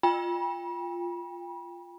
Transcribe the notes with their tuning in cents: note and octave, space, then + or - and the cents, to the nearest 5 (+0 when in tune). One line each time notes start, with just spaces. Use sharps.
F4 +0 G5 +30 B5 -35